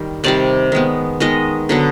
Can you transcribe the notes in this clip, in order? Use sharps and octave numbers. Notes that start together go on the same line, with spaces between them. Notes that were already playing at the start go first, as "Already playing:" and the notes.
Already playing: D#3 G3
C3 D#3 G3 D5
D#3 G#3 B3
D#3 G#3 B3 D#5
D3 F#3 B3